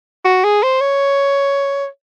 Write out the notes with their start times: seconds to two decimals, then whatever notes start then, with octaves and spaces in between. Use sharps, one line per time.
0.25 F#4
0.44 G#4
0.63 C5
0.81 C#5